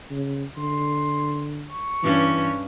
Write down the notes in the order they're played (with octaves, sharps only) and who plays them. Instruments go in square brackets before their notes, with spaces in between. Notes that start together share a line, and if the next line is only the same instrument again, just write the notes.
[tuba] C#3
[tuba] D3 [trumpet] C6
[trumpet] C#6
[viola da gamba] G2 C#4 [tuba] E3